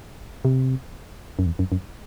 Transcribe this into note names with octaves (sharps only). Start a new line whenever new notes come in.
C3
F#2
E2
F#2
F#2